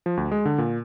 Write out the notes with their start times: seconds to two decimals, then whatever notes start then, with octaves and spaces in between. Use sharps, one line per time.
0.06 F3
0.17 D2
0.32 G#3
0.45 D3
0.58 A#2